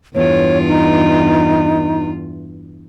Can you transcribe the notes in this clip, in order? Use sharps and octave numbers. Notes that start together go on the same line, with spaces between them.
E2 G2 F4 C#5
D#4